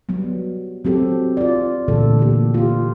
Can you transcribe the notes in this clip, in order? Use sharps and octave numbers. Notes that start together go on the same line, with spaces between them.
F#3 G3 B3
F#3 C4 G4 A4
F4 D5
A#2 D3 E3 A3 A4
A#3 G4
F4 G4